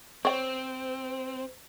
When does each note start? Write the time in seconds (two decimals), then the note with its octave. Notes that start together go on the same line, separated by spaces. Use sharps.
0.25 C4 C5 C#5 G5